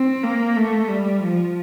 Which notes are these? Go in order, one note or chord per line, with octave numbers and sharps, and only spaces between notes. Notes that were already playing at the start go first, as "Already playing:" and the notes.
Already playing: C4
A#3
A3
G3
F3